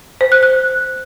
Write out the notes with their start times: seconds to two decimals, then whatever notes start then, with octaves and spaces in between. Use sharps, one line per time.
0.21 C5
0.32 F#6
0.43 F#6